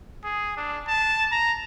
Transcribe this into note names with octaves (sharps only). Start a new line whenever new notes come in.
G#4
D4
A5
A#5